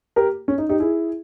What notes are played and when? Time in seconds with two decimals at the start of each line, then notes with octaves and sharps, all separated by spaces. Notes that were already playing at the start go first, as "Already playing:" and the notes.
0.16 G4 A#4
0.48 C#4
0.58 D#4
0.69 D#4 G4
0.80 E4 G#4